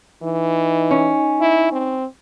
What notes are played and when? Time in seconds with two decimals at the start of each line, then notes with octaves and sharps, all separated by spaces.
0.23 E3 D#4
0.91 C#4
1.41 E4
1.72 C4